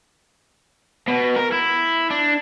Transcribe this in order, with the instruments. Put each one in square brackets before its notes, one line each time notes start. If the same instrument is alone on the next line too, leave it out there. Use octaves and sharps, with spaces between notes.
[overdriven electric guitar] B2
A#4
E4
D4